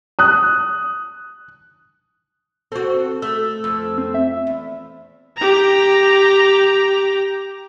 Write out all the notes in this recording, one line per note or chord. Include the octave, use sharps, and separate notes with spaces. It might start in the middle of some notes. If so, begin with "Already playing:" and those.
D#6 F#6
C4 F#4 A4
A3 E6
F2
C4
E5
E2
G4 A#5